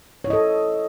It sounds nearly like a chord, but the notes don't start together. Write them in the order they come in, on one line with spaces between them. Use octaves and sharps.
C#5 E4 D#5 A4